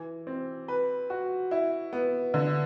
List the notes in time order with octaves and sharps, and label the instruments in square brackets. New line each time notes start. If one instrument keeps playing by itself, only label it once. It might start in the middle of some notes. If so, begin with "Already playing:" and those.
Already playing: [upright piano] E3
C4
B4
F#4
E4
B3
D3